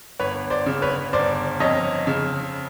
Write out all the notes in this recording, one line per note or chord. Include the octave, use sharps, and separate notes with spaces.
G1 B4 C#5
C5 D5
C#3
B4 C#5
G1 C5 D5
F2 C#5 D#5
C#3